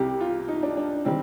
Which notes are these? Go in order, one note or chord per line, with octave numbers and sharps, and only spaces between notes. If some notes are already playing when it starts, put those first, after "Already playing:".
Already playing: C2 C3 G3 G4
F4
D#4
D4
D4
D#3 G3 C4